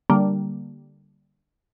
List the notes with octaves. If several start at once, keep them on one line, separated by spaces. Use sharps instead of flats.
D3 G3 A#3